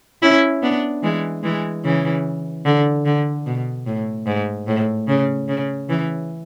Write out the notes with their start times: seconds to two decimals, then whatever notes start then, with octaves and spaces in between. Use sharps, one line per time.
0.22 C#4 E4
0.62 B3 D4
1.03 E3 G#3
1.43 E3 G#3
1.84 C#3 E3
2.65 D3
3.05 D3
3.46 B2
3.86 A2
4.27 G#2
4.67 A2
5.08 C#3
5.48 C#3
5.89 C#3 E3